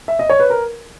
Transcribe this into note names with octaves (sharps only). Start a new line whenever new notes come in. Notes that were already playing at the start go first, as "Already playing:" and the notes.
E5
D#5
C#5
B4
A#4